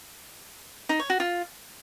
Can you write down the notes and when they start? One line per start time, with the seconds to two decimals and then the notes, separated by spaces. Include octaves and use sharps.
0.89 D#4
0.99 C#5
1.10 F#4
1.20 F4